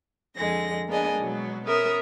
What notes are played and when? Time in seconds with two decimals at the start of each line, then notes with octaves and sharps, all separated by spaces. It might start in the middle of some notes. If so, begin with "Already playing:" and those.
0.36 F2 D3 G#3 A#6
0.88 A#3 B3 D4 G#4 D#5 G#5
1.20 B2 F#3 G#3 B3
1.65 B3 C#4 A#4 E5 D#6